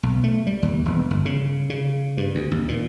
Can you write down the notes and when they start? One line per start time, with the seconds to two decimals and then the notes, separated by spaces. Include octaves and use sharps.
0.03 B1
0.24 A3
0.47 G3
0.62 D#2
0.85 E1
1.10 G1
1.25 C#3
1.70 C#3
2.17 G2
2.35 D2
2.51 D#2
2.68 A#2